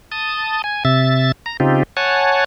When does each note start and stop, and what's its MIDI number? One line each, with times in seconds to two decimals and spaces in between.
0.12 0.62 81
0.12 0.62 87
0.64 0.84 80
0.85 1.32 48
0.85 1.32 76
0.85 1.32 93
1.46 1.57 82
1.60 1.83 49
1.60 1.83 60
1.60 1.83 63
1.60 1.83 65
1.60 1.83 67
1.97 2.44 73
1.97 2.44 78
1.97 2.44 80
1.97 2.44 81